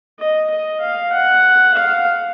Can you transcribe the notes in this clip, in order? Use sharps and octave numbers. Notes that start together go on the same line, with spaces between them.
D#5
D#5
F5
F#5
F5